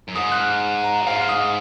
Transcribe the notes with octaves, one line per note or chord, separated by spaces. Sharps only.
F#2
G#2 D#6
F#6
F6
A#5
F#2
G#2 F5
F6
D#6